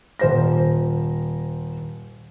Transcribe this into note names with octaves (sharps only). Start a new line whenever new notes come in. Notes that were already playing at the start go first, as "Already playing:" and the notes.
D#1 C5 A#6